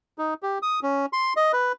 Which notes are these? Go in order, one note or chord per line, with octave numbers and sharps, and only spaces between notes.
D#4
G4
D#6
C#4
C6
D#5
B4